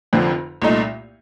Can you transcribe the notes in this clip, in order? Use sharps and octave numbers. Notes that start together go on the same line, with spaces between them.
F1 F2 D3 F3 C4
C2 A#2 A3 D#4